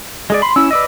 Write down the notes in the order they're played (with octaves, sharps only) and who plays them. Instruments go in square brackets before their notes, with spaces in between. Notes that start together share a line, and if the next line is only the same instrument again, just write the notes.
[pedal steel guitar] G#3 G#4 D5
[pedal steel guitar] B5 [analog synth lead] C6
[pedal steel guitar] C#4 E4 [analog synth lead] E6
[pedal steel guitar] B4 D5 D#5